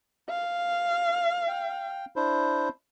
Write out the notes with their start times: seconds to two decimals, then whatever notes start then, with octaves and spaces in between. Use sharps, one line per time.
0.29 F5
1.47 G5
2.16 D4 E4 C5